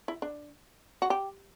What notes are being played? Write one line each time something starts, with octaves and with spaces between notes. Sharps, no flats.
E4
D4
F#4
G4